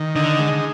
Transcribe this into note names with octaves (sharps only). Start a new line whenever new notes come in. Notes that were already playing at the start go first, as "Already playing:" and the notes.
Already playing: D#3
D3 D#4
G#3